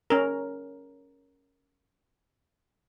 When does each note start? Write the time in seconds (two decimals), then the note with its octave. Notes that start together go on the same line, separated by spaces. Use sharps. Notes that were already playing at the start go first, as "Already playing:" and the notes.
0.10 C#4 A#4